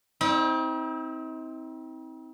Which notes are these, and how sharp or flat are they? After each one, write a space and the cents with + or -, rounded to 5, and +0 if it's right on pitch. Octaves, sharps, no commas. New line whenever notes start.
C4 +0 D#4 +45